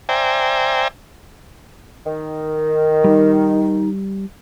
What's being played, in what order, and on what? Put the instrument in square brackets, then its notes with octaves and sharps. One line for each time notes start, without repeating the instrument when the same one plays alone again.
[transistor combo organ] C5 D5 E5 G5 G#5 A#5
[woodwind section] D#3
[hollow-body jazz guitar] G3 [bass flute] D#4